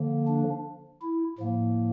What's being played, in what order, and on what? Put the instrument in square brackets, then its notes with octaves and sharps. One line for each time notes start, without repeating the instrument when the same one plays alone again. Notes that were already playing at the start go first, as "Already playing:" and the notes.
Already playing: [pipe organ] D3 F3 A#3
D4
E4
A2 F3 A#3